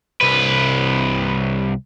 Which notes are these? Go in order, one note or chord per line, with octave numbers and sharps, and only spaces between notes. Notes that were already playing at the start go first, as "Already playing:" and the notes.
C2 B4